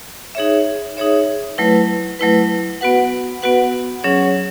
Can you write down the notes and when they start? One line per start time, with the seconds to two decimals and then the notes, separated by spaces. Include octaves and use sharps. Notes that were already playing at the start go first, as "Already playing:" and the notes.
0.35 D#4 G#4 C#5 E5
0.97 D#4 G#4 C#5 E5
1.58 F#3 A3 E4 B4
2.19 F#3 A3 E4 B4
2.81 B3 F#4 B4 F#5
3.42 B3 F#4 B4 F#5
4.04 F#3 C#4 G#4 C#5 F#5